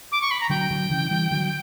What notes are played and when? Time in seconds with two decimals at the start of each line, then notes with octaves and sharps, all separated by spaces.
0.12 D6
0.22 C#6
0.31 B5
0.40 A#5
0.50 D3 F#3 G5
0.71 D3 F#3
0.90 C#3 E3
1.11 E3 G3
1.31 D3 F#3